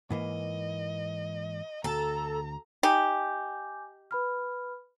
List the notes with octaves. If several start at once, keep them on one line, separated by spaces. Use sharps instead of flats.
G#2 E3 A#3 D#5
D2 A4 A#5
D#4 G4 G#5 D6 G6
B4 B5 F6